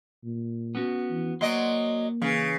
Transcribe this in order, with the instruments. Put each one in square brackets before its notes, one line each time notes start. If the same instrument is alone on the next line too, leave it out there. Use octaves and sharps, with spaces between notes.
[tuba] A#2
[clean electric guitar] B3 C#4 F#4
[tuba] E3
[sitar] F#3 D#5 [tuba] A#3 [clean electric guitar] C5 D5 C6
[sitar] C#3 [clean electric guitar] E3 B4